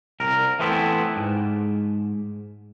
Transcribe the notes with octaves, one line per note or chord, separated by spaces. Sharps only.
C2 A#4
E3 A3 B3 C4 E4
G#2